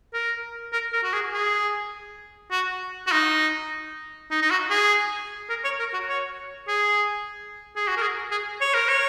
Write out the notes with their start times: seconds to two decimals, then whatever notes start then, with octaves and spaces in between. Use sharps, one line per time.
0.13 A#4
0.73 A#4
0.93 A#4
1.03 F#4
1.13 G#4
1.33 G#4
2.51 F#4
3.07 F#4
3.12 D#4
4.31 D#4
4.42 D#4
4.51 F#4
4.70 G#4
5.49 A#4
5.64 C#5
5.80 A#4
5.93 F#4
6.09 C#5
6.68 G#4
7.76 G#4
7.88 F#4
7.97 A#4
8.02 G#4
8.31 G#4
8.61 C#5
8.74 A#4
8.89 C#5